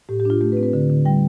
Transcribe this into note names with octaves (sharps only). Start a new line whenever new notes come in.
A2 G4
G4
D4 F4
A3 G4
B4
C4
B4
D3
D3
G3 G5